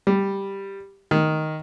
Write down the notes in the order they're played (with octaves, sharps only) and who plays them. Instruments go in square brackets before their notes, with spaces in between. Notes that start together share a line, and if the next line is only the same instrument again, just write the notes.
[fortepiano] G3
D#3